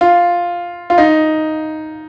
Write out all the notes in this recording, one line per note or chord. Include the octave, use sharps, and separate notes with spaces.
F4
F4
D#4